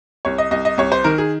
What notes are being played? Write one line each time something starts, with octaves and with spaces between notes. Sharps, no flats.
C2 C#5
D#5
C2 D#5
D#5
C2 C#5
C5
D#3 A#4
G#4